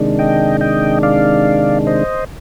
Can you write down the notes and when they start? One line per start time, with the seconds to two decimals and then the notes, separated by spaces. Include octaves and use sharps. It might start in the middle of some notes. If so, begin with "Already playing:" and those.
Already playing: C3 D#3 G#3 D4
0.19 D#5 G5
0.61 D#5 G5
1.03 D5 F5
1.87 C5 D#5